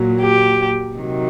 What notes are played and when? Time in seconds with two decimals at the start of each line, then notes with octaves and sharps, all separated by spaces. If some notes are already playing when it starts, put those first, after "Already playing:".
Already playing: A#2 F#3
0.22 G4
0.96 C3 D#3 F#3